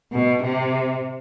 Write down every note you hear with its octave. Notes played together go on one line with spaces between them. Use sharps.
B2
C3